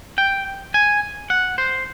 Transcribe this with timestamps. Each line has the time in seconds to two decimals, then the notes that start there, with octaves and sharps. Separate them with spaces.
0.18 G5
0.74 G#5
1.30 F#5
1.58 C5